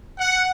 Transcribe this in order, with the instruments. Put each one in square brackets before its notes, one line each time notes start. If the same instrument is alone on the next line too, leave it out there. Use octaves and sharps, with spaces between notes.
[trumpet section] F#5